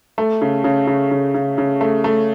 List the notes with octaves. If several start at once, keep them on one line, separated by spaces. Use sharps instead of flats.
A3
C#3
C#3
C#3
C#3
C#3
C#3
A3
A3